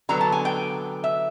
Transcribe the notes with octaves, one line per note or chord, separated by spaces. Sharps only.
D3 F#3 B3 A#5
A5
G#5
G5
E5